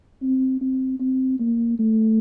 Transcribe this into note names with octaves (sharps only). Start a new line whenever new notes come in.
C4
C4
C4
A#3
A3